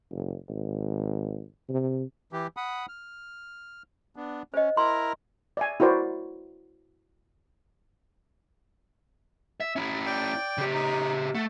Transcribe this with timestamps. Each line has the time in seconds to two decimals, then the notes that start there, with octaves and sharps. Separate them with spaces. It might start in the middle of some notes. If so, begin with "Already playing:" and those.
0.12 F#1
0.49 G#1
1.69 C3
2.33 E3 G4
2.57 F#5 B5 D#6
2.88 F6
4.16 B3 D4
4.54 C#4 C5 D#5
4.77 E4 A#4 A#5 C6
5.57 D5 E5 G#5
5.80 E4 F#4 A#4 C5 D5
9.60 E5
9.76 C#4 E4
10.06 D5 G5
10.58 C#3 G4
10.74 D#4
11.35 A3 F#5